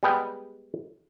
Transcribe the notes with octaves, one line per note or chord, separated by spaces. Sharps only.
G3 G#3 B3 G5